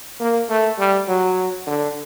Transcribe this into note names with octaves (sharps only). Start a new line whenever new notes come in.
A#3
A3
G3
F#3
D3